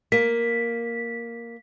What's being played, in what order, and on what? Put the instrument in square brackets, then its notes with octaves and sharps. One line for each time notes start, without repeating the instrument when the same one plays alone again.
[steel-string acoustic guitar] A#3 [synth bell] B6